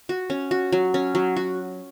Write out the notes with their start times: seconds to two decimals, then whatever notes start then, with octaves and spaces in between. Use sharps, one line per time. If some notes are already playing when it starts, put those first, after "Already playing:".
0.09 F#4
0.30 C#4
0.51 F#4
0.72 F#3
0.94 C#4
1.15 F#3
1.37 F#4